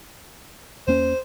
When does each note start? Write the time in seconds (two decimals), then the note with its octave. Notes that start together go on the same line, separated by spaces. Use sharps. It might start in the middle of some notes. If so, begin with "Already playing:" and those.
0.87 E2 A#3 C#4 C5